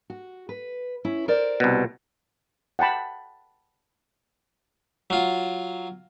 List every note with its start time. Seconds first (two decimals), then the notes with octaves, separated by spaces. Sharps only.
0.10 F#4
0.49 B4
1.05 C#4 E4
1.28 A#4 C5 D5
1.60 C2 B2
2.79 F#5 G5 A5 B5
5.10 F#3 F4